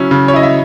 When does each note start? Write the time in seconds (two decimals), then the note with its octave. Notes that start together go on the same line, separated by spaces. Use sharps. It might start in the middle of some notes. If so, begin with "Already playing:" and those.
Already playing: C#3 F#3 C#4 E4
0.11 C#3
0.28 C#5
0.33 E4 D#5
0.43 E5